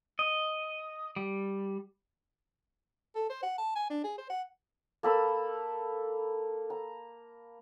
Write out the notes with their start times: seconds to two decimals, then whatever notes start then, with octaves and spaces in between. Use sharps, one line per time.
0.19 D#5
1.16 G3
3.15 A4
3.30 C5
3.43 F#5
3.58 A5
3.75 G#5
3.90 D4
4.04 G#4
4.18 C5
4.30 F#5
5.03 A#3 A4 B5 E6
6.70 A#5